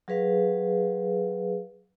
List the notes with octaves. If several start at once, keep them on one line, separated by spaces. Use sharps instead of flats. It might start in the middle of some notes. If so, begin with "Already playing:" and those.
F#3 G#4 B4 F5